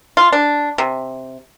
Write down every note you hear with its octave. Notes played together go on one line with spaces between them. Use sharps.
F4
D4
C3